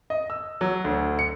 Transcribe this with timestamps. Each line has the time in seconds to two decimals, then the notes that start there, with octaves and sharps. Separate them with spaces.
0.10 D#5
0.30 E6
0.61 F#3
0.84 D2
1.19 C#7